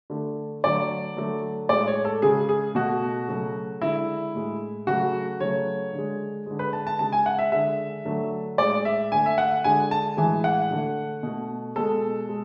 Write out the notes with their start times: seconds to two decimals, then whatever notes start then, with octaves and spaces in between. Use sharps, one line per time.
0.10 D3 A3
0.64 D3 F#3 A3 D5
1.16 D3 F#3 A3
1.69 A2 G#3 D5
1.87 C#5
2.05 A4
2.22 C#3 G#3 G#4
2.49 G#4
2.75 B2 A3 F#4
3.29 C#3 F#3 A3
3.82 D3 G#3 E4
4.35 A2 G#3
4.87 C#3 F#3 A3 F#4
5.40 C#3 F#3 A3 C#5
5.93 D3 G#3
6.46 D3 G#3
6.59 B4
6.73 A5
6.87 A5
6.99 C#3 G#3 A5
7.12 G#5
7.26 F#5
7.39 E5
7.52 D3 G#3 E5
8.05 D3 F#3 A3
8.58 A2 G#3 D5
8.85 E5
9.12 D3 A3 G#5
9.26 E5
9.38 F#5
9.64 D3 G#3 G#5
9.91 A5
10.17 A2 E3 G#3 G#5
10.44 F#5
10.71 D3 A3
11.23 B2 A3
11.76 B2 G#3 A4
12.29 G#3